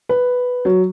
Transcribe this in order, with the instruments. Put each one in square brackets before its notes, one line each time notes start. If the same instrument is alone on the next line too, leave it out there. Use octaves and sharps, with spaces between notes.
[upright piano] B4
F#3